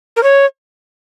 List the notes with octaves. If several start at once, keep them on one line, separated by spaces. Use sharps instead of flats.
A#4
C#5